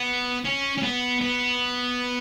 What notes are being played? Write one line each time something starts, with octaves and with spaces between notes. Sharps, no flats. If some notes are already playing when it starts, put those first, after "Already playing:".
Already playing: B3
C#4
C#4
B3
B3